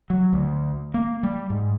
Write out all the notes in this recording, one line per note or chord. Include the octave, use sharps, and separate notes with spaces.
F#3
D2
A#3
G3
G#2